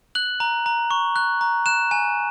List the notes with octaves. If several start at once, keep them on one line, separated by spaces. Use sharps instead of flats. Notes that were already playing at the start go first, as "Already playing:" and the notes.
F#6 F#7
A#5
A#5
C#6
F#6
A#5
F#6 E7
G#5